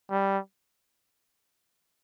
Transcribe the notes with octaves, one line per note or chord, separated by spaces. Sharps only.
G3